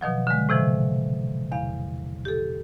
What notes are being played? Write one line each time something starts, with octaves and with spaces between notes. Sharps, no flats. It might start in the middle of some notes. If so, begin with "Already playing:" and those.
B2 D#3 F3 F#3
D3 G#3
A2 C3 E3 F3
E2 F5
G4 A4